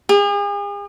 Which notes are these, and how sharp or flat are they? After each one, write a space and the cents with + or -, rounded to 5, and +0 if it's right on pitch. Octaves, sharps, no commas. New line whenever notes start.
G#4 -40